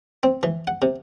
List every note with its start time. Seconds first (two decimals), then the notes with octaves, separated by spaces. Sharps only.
0.23 C4
0.43 E3
0.67 F#5
0.82 C3